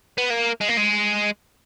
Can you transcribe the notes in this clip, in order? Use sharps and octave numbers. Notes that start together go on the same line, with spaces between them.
B3
A#3
G#3
A#3
G#3